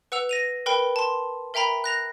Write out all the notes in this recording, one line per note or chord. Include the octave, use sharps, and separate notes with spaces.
B4 F#5 E6 F7
A#6 D#7 F7
A#4 B4 G5 B5 G7
A5 C6
A#4 E5 G5 A#5 B5
F#6 A#6 F7